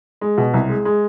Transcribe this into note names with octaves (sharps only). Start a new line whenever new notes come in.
G#3
B2
C2
G#3
G#3